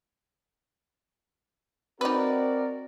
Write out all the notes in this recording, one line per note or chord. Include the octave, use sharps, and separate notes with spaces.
C4 D#4 F#4 A#4 B4 D5